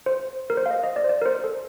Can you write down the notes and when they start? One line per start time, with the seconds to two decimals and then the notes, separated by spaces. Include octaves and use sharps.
0.06 C5
0.50 A#4
0.57 C5
0.66 F5
0.71 D#5
0.84 D#5
0.96 D5
1.04 C5
1.09 D5
1.22 A#4
1.26 C5
1.44 A4